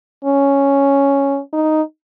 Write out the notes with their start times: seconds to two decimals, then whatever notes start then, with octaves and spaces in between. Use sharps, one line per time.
0.24 C#4
1.53 D#4